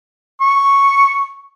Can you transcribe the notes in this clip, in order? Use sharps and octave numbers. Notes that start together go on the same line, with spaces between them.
C#6